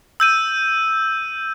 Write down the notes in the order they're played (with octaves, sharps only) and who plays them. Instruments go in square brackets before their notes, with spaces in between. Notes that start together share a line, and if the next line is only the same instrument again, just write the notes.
[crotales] E6 G6 D#7